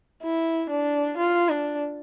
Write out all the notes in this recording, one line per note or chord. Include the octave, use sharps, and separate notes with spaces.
E4
D4
F4
D4